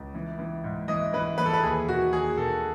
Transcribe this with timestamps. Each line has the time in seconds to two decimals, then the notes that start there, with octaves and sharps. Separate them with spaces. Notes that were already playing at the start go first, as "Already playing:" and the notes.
Already playing: C#2
0.14 E3
0.39 E3
0.64 G#2
0.88 E3 D#5
1.13 E3 B4
1.38 E3 B4
1.46 A4
1.53 B4
1.63 D#2 G#4
1.88 D#3 F#4
2.12 D#2 G#4
2.37 D#3 A4